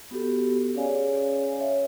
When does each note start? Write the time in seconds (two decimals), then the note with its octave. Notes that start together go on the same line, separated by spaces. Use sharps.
0.11 B3 F#4 G4 A4
0.75 C#4 G#4 C#5 D5 F5 G#5
1.59 C#5 E5 F5